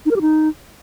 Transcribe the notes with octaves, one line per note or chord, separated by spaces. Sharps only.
D#4
A#4
G4
D#4